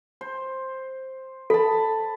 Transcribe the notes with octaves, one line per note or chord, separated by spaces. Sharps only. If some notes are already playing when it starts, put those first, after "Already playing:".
C5
A4 A5 B5